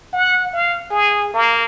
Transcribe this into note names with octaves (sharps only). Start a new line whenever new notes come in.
F#5
F5
G#4
A#3